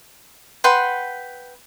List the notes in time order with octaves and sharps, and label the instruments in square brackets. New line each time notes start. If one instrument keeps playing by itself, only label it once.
[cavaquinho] B4 F#5 G5 C6